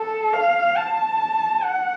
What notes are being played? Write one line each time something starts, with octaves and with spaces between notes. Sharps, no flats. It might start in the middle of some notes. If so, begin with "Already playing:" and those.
Already playing: A4
F5
A5
F#5